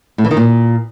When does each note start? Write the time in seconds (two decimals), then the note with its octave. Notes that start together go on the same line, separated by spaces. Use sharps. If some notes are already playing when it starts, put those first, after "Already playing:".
0.18 A2
0.24 E3
0.31 D#3
0.37 A#2